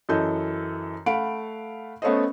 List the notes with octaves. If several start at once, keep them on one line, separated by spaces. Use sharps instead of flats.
F#2 E3 A4 D#5 G6
A3 F5 F#5 B5 D7
A3 B3 C#4 A4 C5 D#5